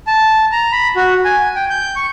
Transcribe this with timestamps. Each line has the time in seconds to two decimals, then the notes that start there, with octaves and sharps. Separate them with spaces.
0.07 A5
0.52 A#5
0.72 B5
0.96 F#4
1.25 G#5
1.55 G5
1.70 G6
1.96 C#6